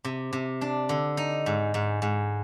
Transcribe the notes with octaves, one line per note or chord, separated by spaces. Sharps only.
C3
C3
D4
D3
D#4
G#2
G#2
G#2